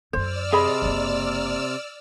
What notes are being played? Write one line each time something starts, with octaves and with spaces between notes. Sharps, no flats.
F#2 D3 C5 D5 E6 F6
C3 G#4 D#5 B5
F#1 A#3